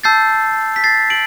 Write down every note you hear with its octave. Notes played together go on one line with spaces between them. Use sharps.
A5 E6 G6 A6 C7
B6
A6 C7
D7 F#7